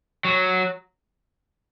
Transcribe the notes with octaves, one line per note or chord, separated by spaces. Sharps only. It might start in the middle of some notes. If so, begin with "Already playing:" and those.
F#3